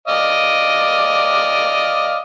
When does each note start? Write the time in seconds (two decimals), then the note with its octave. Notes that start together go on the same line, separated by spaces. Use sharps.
0.08 D5 D#5 F5